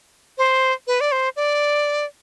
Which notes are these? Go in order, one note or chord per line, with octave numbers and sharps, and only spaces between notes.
C5
B4
D5
C5
D5